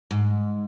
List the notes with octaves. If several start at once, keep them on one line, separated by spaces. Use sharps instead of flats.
G#2